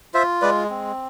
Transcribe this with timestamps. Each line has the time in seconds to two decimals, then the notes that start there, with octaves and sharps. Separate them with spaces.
0.14 F4 C5 E5
0.42 G#3 B4 D5
0.70 C4